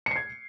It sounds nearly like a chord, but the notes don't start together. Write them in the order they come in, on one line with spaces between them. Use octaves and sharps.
C#7 C7 G#6